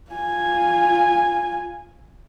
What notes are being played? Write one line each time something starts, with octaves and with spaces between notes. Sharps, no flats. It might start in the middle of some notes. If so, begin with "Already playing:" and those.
F4 G#5